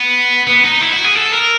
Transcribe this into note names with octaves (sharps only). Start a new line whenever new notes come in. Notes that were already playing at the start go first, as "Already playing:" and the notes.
Already playing: B3
B3
D#4
E4
F#4
G#4
A4
A#4